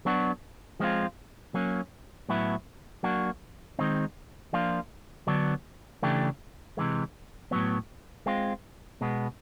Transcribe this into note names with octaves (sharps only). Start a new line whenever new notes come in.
F#3 B3 D4 F#4
F3 G#3 C4 F4
F#3 A#3 C#4
A2 F#3 B3 E4
F#3 A#3 D4 F#4
D#3 G#3 C4 D#4
F3 A#3 D4 F4
D3 F#3 B3 D4
C#3 E3 A3 D4 G4
C3 E3 G#3
A2 F#3 B3
G#3 C4 F4
B2 G#3 B3